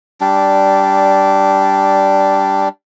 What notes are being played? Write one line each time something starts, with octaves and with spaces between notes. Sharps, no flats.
G3 D4